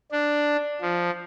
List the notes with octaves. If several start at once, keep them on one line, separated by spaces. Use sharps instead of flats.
D4
F3